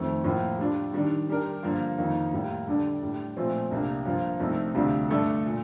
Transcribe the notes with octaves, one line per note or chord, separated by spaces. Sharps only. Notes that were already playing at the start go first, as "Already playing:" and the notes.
Already playing: F2 D#3 A3 C4
A2 F3 A#3
G3 D4 F4
D#3 G3 D4
G3 D4 G4 A#4
G2 D3 F3 A#3 F4
F2 D#3 A#3 D#4
A2 G3 A#3
D3 G3 D4 A4 D5
A2 G3 D4
A#2 F3 A3 C4
C2 C3 G3 A#3 D4
G2 F3 A#3 F4
C2 C3 F3 A3 D#4
D2 C3 G3 D4 F4
G2 D3 A3 D4 A4
A#2